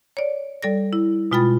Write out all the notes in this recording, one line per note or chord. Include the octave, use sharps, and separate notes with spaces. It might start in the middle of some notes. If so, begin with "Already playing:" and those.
C#5 D5
G3 A4 D5 A#6
E4
B2 G#3 F4 G5 B5 A6